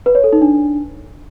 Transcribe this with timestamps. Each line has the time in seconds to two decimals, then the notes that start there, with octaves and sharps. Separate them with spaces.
0.06 B4
0.15 C#5
0.24 A4
0.33 D#4
0.41 D4